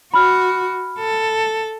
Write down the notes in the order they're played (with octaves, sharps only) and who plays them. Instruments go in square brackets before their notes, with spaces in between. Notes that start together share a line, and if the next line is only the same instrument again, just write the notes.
[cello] F#4 [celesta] B5 F6
[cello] A4